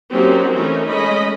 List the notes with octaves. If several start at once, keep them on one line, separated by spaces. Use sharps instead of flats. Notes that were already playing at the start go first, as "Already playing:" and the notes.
F#3 A#3 C4 C#4 D#4 G4
E3 A3 C#4 D#4 A#4
G#3 A3 C#4 D#5 B5